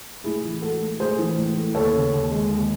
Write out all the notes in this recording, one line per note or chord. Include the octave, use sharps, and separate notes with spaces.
A2 E4 G#4
E3
A2 F#4 A4
A3
A2 G#4 C5
E3
A2
A3
D#2 A4 C#5
C#3
D#2
G#3
D#2